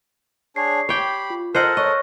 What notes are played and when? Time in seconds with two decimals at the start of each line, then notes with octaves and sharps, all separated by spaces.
0.56 D4 G#4 C#5 C7
0.89 G4 C#5 G5 B5
1.30 F4
1.55 A4 A#4 C5 D#5 F#5 F6 F#6
1.77 C#5 D#5 C#6 F#6